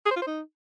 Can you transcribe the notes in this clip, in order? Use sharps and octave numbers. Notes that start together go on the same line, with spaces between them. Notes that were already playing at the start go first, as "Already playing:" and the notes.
G#4
C5
F4
C5
D#4